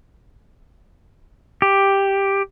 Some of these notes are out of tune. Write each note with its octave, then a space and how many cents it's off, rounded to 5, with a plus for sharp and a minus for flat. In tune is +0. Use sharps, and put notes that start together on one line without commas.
G4 +5